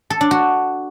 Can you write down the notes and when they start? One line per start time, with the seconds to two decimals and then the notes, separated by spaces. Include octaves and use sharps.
0.10 A4
0.21 D4
0.31 F#4